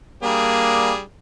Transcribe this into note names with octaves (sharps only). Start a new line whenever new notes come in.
G3 A#3 D4 G#4